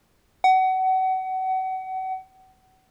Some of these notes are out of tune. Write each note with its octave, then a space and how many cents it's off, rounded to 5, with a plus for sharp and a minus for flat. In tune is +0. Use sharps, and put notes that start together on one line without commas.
F#5 +30